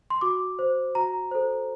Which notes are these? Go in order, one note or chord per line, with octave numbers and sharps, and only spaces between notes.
C6
F#4 D6
C5
F#4 A#5
A4 C5